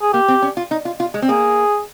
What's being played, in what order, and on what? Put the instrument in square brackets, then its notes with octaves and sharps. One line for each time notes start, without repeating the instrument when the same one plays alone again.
[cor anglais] G#4
[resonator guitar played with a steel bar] A#3 [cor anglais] G4
[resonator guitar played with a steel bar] C4
C#4
F4
D#4
F4
F4
G#3
C4
[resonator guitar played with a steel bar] A#3 [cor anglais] G#4